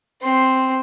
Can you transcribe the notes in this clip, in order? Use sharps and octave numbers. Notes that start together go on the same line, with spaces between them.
C4 C6